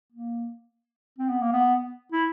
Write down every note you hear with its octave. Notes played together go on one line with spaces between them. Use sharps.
A#3
C4
B3
A#3
B3
E4